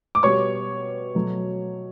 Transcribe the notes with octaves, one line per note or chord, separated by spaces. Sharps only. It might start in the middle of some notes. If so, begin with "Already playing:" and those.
D6
B2 G3 B3 C#5 C#6
B2 F#3 A3